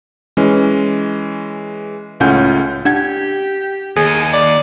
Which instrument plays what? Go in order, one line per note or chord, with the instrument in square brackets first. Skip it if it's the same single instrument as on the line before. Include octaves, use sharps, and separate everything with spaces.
[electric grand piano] E3 G#3 C#4
C#2 A2 C#4 F4 F#5 G6
[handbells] D4 F#5 G#6 [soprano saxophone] G4
[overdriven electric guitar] D#2 [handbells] G#4 [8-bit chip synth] G#5
[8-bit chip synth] D5